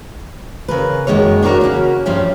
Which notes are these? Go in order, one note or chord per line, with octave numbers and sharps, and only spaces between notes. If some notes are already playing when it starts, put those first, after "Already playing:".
C#3 A#4 B4
F#2 C3 D#3 G#3 A#3 C#5
D4 D#4 F#4 G4 A#4 C#5
C#3 A#3 C#4 F#4
G2 F3 G3 A3 C#4